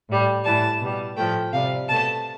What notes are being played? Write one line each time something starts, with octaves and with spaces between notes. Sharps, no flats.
A2 G3
A2 E3 G3 A5
B2 G3
A2 F3 A3 G5
C3 G3 F5
B2 A3 A5